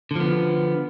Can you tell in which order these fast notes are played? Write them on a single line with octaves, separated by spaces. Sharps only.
D3 F3 B3